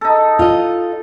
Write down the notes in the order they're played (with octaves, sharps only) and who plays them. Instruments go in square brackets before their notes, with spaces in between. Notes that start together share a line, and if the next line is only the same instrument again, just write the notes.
[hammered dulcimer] D#4 A4
[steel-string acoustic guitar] F4 D#5